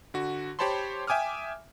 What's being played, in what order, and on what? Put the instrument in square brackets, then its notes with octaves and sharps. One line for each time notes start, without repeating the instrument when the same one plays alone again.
[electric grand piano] D3 F#4
G4 C5 C#5 A5 B5 C6
E5 G5 G#5 D6 D#6 F6